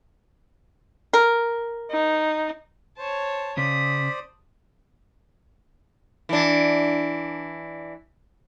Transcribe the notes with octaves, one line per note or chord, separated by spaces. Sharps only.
A#4
D#4
C5 C#5 A5
C#3 C5 D5 D#6 B6
E3 D4